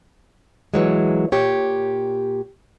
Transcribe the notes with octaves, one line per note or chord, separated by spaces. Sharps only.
E3 F#3 G#3
A#2 G4 C#5